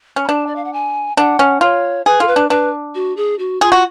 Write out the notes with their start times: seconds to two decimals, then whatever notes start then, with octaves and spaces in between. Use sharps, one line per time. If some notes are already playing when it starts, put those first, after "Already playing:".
0.16 C#4
0.25 B5
0.28 D4 A5
0.47 D5
0.56 F5
0.65 F#5
0.73 G#5
1.17 D4 F#5
1.39 C#4
1.61 F4 C#5
2.06 G#4 B4
2.20 F4 A4
2.28 B4
2.36 D4
2.50 D4 B4
2.95 F#4
3.17 G#4
3.39 F#4
3.61 F4 G#4
3.72 F#4